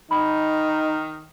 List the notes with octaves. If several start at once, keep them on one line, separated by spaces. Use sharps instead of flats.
D#3 D#4 B5